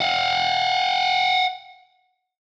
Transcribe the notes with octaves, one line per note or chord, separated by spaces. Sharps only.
F5 F#5